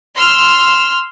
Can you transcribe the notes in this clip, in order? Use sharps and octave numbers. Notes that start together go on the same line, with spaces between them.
C6 E6 F6